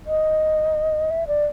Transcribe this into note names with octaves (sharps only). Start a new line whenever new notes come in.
D#5
E5
D5